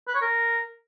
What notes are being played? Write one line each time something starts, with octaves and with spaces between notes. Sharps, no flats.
B4
C#5
A#4